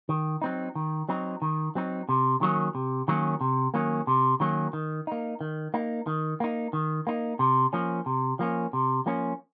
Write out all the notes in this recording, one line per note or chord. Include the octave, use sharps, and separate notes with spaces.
D#3
F#3 C4 D#4
D#3
F#3 C4 D#4
D#3
F#3 C4 D#4
C3
D#3 F#3 A#3 C#4
C3
D#3 F#3 A#3 C#4
C3
D#3 F#3 A#3 C#4
C3
D#3 F#3 A#3 C#4
D#3
A#3 D#4
D#3
A#3 D#4
D#3
A#3 D#4
D#3
A#3 D#4
C3
F3 A#3 C#4
C3
F3 A#3 C#4
C3
F3 A#3 C#4